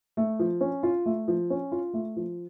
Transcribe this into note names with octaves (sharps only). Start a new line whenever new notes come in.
A3
F3
C#4
F4
A3
F3
C#4
F4
A3
F3